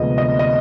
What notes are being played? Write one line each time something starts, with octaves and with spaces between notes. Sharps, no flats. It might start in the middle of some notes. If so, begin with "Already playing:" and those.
Already playing: D2 C3 F3 G#3 B3 D#5
D#5
D#5